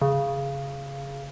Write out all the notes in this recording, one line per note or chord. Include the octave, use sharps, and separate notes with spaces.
C#3